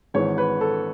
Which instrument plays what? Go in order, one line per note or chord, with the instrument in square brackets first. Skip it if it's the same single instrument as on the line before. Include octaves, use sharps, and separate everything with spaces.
[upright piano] G#1 G#2 E3 C#5
B4
A4